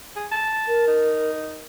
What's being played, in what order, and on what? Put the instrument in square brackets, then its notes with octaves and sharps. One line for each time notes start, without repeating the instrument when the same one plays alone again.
[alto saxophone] G#4
A5
[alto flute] A#4
[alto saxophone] D#4